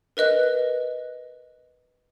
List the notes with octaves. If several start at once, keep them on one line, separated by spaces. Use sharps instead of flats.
A#4 B4 D#5 F#6